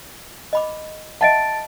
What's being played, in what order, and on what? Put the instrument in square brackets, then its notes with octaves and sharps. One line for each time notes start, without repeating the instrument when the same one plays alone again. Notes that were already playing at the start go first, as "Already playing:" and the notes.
[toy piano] D#5 B5 D6
[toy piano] D#5 E5 F#5 [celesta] A5 A6 D7